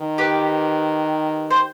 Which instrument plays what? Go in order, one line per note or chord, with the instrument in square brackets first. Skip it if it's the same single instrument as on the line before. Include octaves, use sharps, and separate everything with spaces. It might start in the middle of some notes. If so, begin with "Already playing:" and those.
Already playing: [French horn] D#3
[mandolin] G4 B4
C5